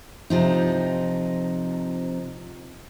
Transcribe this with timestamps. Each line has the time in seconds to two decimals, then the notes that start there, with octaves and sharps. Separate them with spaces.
0.30 C3 F3 D#4